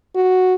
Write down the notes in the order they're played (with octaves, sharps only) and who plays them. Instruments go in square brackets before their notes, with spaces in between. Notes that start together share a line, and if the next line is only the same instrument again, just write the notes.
[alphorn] F#4